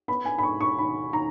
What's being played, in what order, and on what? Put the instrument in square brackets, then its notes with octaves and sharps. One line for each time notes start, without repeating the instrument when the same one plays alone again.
[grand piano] B3 B5
G#5
B5
G#2 C#6
C#6
D#3 B5
D#3 A#5